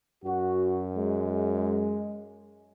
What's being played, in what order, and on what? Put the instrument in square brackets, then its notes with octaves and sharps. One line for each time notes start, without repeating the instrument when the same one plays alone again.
[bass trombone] F#2 [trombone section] F#4
[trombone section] G#3